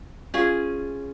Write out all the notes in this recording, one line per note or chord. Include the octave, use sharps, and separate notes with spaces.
C#4 F4 G#4